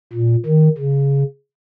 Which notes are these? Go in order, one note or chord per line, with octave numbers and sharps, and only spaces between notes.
A#2
D#3
C#3